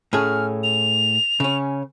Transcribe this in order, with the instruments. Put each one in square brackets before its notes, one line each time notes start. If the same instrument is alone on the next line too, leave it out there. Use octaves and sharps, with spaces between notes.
[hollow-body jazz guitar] A2 C#4 G#4 [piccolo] F6
[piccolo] F7
[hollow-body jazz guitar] C#3 C#4